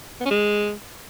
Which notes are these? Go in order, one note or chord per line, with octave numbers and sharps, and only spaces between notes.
B3
C#4
G#3